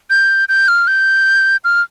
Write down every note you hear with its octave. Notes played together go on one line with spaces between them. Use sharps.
G6
G6
F6
G6
F6